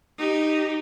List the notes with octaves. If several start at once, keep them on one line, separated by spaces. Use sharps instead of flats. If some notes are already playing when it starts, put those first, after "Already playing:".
D#4 G4